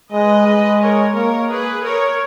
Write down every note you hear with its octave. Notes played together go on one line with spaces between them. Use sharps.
G#3 B4 D#5
G#3
A#4 C#5
A#3 A#4 C#5
G#4 B4
A#4 C#5